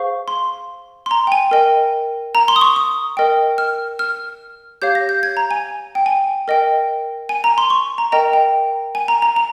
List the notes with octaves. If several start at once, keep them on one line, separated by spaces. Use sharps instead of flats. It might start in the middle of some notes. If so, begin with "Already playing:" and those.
Already playing: G#4 C5 F5 C#6
C6
C6
A#5
G5
G#5
A#4 D#5 G5
A#5
C6
D#6
C#6
D#6
A#4 D#5 G5
F6
F6
G4 C#5 F5 G6
A#6
G6
G#6
A#5
G#5
G5
G#5
A#4 D#5 G5
G#5
A#5
C6
C#6
A#5
A#4 D#5 G5 A#5
G5
G#5
A#5
A#5
A#5